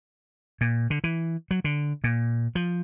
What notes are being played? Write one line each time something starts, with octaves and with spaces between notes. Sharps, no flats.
A#2
D3
E3
F#3
D3
A#2
F3